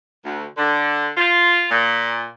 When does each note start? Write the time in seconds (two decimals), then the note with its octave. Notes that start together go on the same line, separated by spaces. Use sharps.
0.25 D2
0.57 D3
1.17 F4
1.70 A#2